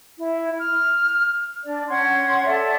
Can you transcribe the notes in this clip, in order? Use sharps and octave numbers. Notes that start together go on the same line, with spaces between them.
E4
F6
D4 D5
C#4 F#5 C6 G#6
A4 D5 E5